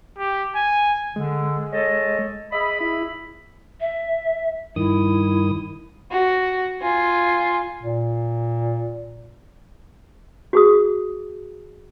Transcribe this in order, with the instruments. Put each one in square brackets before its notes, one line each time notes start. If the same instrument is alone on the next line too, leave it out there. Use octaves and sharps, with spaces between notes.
[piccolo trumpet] G4
G#5
[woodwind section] D3 [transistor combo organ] G#3
[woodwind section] A4 C#5 D#5
[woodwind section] G#4 E5 B5 [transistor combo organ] D#5
[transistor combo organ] E4
[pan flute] E5
[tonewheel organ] G2 D#3 D#6 [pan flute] E4
[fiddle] F#4
F4 G#5
[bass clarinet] A#2
[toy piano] F#4 G#4 D#6